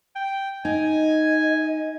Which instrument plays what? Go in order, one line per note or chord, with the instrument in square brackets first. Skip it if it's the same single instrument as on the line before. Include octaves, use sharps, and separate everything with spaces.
[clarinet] G5
[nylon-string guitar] D#4 [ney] D#5 [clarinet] G#5